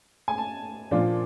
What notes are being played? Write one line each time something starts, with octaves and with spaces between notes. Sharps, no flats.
G#5
A5
A#2 F3 A#3 D4 F4